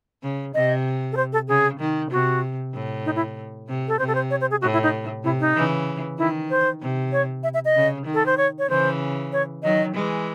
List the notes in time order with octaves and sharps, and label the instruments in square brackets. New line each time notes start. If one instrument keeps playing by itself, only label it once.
[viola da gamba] C#3
[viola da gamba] C3 [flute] D#5
[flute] A4
C5
A4
[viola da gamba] C#3 [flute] G#4
[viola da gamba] D#3
[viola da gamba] C3 [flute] F#4
[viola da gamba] A2
[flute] D#4
E4
[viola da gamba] C3
[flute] A4
[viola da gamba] C3 [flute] C5
[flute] A4
C5
C#5
C5
G#4
[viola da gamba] A2 [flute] F#4
[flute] E4
D#4
[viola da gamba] C3 [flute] E4
[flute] D#4
[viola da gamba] C#3 E3
[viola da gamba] D#3 [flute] E4
[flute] C5
[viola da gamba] C3
[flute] C#5
E5
E5
D#5
[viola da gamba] C#3
D#3
[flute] A4
C5
C#5
C#5
[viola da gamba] C#3 E3 [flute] C5
[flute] C#5
[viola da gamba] D#3 F#3 [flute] D#5
[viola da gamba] E3 G#3